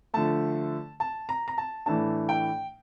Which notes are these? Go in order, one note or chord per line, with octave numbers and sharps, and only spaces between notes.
D3 F3 A3 A5
A5
A#5
A#5
A5
A2 E3 A3 D4 A5
G5